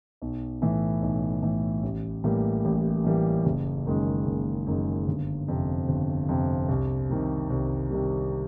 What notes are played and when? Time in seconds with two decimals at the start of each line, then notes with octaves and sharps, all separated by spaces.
0.22 B1
0.62 A2 E3
1.02 B1
1.43 A2 E3
1.83 A1
2.24 A2 E3 G3 A#3
2.65 A1
3.04 A2 E3 G3 A#3
3.45 F#1
3.86 F#2 D#3 G#3
4.26 F#1
4.66 F#2 D#3 G#3
5.07 G1
5.48 F2 C3
5.88 G1
6.29 F2 C3
6.69 C2
7.10 C3 D#3 G3
7.50 C2
7.90 C3 D#3 G3